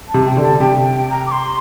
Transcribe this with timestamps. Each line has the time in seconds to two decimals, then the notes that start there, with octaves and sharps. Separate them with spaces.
0.09 A5
0.14 C3
0.27 G5
0.37 D3
0.43 A5
0.60 C3 G5
0.93 G5
1.10 A#5
1.27 D6
1.32 C6